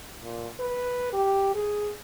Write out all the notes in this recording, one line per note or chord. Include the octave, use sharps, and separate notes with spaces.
A#2
B4
G4
G#4